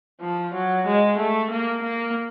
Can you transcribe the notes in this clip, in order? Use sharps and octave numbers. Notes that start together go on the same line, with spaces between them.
F3
F#3
G#3
A3
A#3
A#3